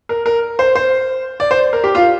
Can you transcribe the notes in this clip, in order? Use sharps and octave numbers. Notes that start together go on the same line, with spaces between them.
A#4
A#4
C5
C5
D5
C5
A#4
G4
F4